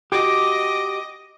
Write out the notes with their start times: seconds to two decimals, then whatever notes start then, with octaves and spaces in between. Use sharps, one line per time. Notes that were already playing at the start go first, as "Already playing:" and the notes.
0.12 F#4 G4 D#5 D6